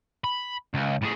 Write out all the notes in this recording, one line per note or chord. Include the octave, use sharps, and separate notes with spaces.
B5
C#2
A2 G#4